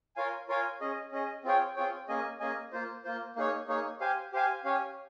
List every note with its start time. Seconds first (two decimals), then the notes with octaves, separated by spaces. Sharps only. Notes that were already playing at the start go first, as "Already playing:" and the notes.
0.16 F4 A#4 C#5 F5 G#5
0.49 F4 A#4 C#5 F5 G#5
0.81 C#4 G#4 D#5
1.12 C#4 G#4 D#5
1.44 C4 F4 G#4 C#5 G5
1.76 C4 F4 G#4 C#5 G5
2.08 A#3 C#4 G#4 D#5 G#5
2.40 A#3 C#4 G#4 D#5 G#5
2.72 A#3 F4 C5
3.04 A#3 F4 C5
3.36 A#3 D#4 G#4 C#5
3.68 A#3 D#4 G#4 C#5
4.00 G4 C5 F5 G#5
4.32 G4 C5 F5 G#5
4.64 C#4 G4 C#5 F5 G#5